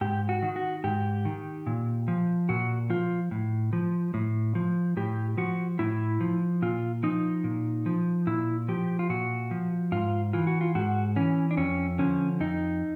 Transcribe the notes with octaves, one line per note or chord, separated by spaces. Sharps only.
G#2 G4
F#4
D#3
F#4
G#2 G4
D#3
A#2
F3
A#2 F#4
F3 F4
A2
F3
A2
F3
A2 G4
F3 F#4
A2 E4
F3
A#2 F4
F3 D#4
A#2
F3
A#2 E4
F3 G4
F4
A#2 F#4
F3
G#2 F4
E3 F4
F#4
F4
G#2 F#4
E3 C#4
D4
F2 C#4
D3 F3 C#4
F2 D#4